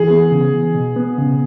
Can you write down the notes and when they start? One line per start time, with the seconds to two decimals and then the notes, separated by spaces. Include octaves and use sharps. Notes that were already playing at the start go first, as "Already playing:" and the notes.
Already playing: E3 G#4
0.10 B3
0.31 C#3
0.53 E3
0.75 B2
0.96 B3
1.18 C#3